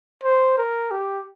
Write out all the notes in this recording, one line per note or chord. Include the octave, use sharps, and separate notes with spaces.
C5
A#4
G4